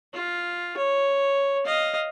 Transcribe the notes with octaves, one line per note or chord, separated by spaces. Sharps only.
F4
C#5
D#5 F5